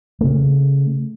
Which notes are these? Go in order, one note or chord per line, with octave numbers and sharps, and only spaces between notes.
C#3 A3